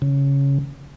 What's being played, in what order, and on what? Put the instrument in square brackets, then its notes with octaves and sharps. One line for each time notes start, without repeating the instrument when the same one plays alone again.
[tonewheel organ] C#3